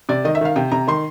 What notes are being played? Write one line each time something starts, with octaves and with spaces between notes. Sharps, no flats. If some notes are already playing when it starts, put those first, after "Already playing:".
C3 D5
D#3 D#5
E5
D#3 F5
C3 G5
C3 A#5
D#3 C6